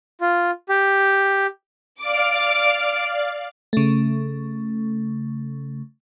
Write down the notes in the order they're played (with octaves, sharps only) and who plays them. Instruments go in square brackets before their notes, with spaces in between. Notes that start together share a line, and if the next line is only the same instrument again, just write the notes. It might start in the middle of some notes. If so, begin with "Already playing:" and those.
[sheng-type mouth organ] F4
G4
[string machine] D5 F5 F6 [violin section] D6
[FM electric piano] C#3 A3